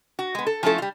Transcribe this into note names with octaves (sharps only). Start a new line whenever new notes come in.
F#4
G#3 B3
A4
F3 A3 C#4 E4 A4
G3 F4